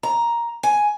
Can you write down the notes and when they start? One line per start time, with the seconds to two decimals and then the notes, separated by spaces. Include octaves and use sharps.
0.03 A#5
0.63 G#5